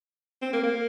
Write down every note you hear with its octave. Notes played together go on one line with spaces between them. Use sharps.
C4
A#3
A#3